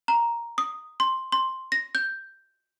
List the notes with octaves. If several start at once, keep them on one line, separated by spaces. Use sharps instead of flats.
A#5
D#6
C6
C6
A#6
G6